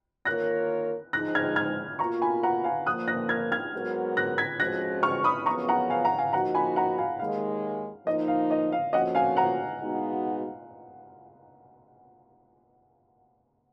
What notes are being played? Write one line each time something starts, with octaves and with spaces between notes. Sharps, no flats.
D#3 A#3 F4 A#4 C#5 F#6 A#6
G#2 F3 G#3 D#4 F#6 A#6
F6 G#6
F6 G#6
B2 A#3 F4 A#5 C#6
G#5 B5
F#5 A#5
F5 G#5
A#2 F3 A#3 D#6 F#6
F#6 A#6
F6 G#6
F6 G#6
G#2 F#3 B3 F#4 A#4
F#6 A#6
G#6 B6
F2 F3 G#3 C#4 F#4 F#6 A#6
C#6 F6
B5 D#6
F#2 C#3 F3 B3 A#5 C#6
F#5 A#5
F5 G#5
F#5 A#5
F5 G#5
F3 A#3 D#4 F#4 F#5 A#5
G#5 B5
F#5 A#5
F5 G#5
D#2 D#3 G#3 F5
F3 A#3 D#4 D#5
F5
D#5
F5
F2 F3 A#3 C#4 F#4 D#5 F#5
F5 G#5
F#5 A#5
B2 G#3 B3 D#4 F#4